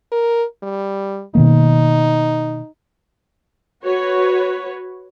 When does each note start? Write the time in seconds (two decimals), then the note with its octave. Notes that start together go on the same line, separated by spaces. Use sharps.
0.12 A#4
0.63 G3
1.35 B2 D#3 A#3 D#4
3.83 F#4 B4 C#5